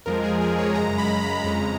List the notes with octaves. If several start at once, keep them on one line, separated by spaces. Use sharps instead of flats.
F2 F3 G#3 A#4
G#4
A#4
C#5
F#2 C#3 G#3 A#5
B5
A#5
F2 C#3 G#3 A#5